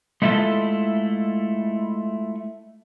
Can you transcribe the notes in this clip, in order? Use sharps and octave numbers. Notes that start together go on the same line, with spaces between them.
G#3 A3 E4 F4 A4 E5